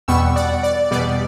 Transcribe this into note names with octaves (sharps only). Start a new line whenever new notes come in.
E2 B2 G3 B3 C#6 E6
D5 F#5
D5
E2 B2 G3 B3 D5